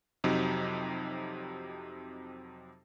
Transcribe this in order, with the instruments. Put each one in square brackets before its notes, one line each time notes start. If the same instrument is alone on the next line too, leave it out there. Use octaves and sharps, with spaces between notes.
[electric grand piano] F2 C3 F#3 D#4